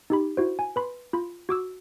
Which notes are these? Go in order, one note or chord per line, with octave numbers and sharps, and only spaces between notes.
D#4 G4 B5
E4 F#4 C5
G#5
B4 B5 C6
F4 B5
F#4 D6 E6